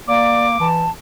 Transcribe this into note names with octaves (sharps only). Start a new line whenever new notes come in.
A#3 D5 D6
E3 A5